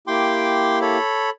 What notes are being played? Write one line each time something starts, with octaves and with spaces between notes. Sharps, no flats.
A#3 E4 G4 G5 C6 D6
A4 C#5 B5